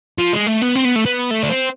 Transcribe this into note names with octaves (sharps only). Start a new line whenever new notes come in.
F3
G#3
A3
B3
C4
B3
A3
B3
A3
D4
C4